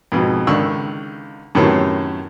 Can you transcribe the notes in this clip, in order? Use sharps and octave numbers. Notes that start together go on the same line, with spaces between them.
F2 G#2 B2
C#2 D3 D#3 C#6 E6
F#2 A2 C3 D#3 B3 C#4